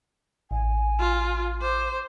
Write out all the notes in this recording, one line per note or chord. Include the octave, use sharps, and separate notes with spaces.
A1 G#5
F4
C5 D6